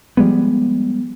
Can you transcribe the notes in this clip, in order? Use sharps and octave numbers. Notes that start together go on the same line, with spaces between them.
F3 G3 G#3 B3